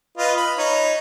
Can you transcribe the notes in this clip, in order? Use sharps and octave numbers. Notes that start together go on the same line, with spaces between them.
F4 B4 D#5
B5
D#4 C#5